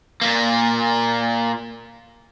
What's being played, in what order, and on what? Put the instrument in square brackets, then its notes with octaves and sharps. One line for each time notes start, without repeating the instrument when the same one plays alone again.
[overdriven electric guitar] A#2 A#3